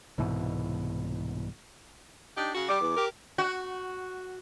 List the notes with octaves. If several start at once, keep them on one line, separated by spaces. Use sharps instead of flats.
C2 G#2 B2 E3
D4 D#4 G4
C#3 F#4
G3 D6
E2
G4 A#4
F#4